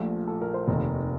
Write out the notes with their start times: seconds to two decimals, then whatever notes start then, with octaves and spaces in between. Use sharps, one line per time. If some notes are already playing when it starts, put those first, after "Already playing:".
Already playing: A#1 A#2 F3 A3 G4
0.28 A4
0.42 A#4
0.54 C5
0.68 F1 D#2 D#3 A#4